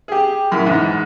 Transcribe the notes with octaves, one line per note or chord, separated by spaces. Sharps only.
G4 G#4
F#2 A2
E2 G#2